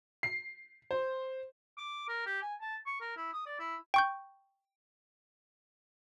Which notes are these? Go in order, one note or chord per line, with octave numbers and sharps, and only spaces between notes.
C7
C5
D6
A#4
G4
G#5
A5
C#6
A#4
E4
D#6
D5
E4
G5 C#6 G6